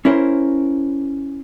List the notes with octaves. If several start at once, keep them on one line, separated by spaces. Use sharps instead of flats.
C#4 E4 A#4 C5